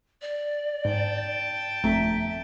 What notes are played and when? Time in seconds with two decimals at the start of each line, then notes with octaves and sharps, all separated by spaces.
0.22 D5
0.85 G#2 G5 A5
1.84 G1 F2 A3 E5 A#5